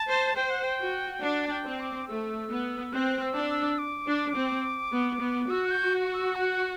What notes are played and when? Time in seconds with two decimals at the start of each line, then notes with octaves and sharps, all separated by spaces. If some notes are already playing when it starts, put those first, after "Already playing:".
Already playing: A5
0.08 C5
0.36 C5 G5
0.50 F#5
0.63 G5
0.79 F#4
1.22 D4 F#5
1.46 A5
1.51 G5
1.65 C4
1.80 D6
2.08 A3 E6
2.51 B3
2.93 C4 F#6
3.22 E6
3.36 D4
3.50 E6
3.78 D6
4.07 D4
4.36 C4
4.93 B3
5.21 B3
5.49 F#4 E6
5.65 F#6
5.71 G6
6.14 E6
6.35 F#5